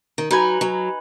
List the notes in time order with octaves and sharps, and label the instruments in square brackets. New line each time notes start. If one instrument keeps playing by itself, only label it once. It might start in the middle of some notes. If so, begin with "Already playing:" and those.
[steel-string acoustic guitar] D#3
[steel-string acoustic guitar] F#3 [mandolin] D#4 B4 G#5
[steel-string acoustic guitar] F#3